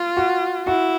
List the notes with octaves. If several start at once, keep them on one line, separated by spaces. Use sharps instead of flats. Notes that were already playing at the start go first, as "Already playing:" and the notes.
Already playing: F4
F#4
E4 F#4